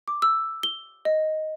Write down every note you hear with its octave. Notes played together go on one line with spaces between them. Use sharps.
D6
E6
G7
D#5